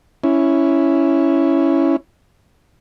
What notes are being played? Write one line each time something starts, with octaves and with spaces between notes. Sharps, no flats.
C#4 E4